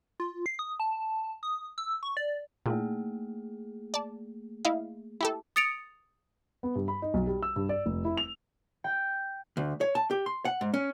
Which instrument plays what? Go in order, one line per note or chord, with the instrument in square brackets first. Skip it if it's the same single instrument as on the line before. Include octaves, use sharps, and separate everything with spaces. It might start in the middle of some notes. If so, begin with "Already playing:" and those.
[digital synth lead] F4
C7
D#6
A5
D#6
E6
C#6
D5
[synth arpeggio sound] A#2 [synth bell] A3 A#3 G#4
[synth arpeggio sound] D5 A5
E4 D#5 F5
E4 G4 A4
[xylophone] D#6 A6 C#7 D7 F7
[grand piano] B3
G2
B5
D#4
B1
G3
E6
G2
D5
F1
E4
F7
[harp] G5
[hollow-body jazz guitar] D2
C#5
A5
G4
C6
F#5
G#2
C#4